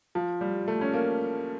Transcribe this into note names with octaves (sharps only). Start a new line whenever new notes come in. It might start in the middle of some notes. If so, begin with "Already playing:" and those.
F3
G3
A3
C#4
A#3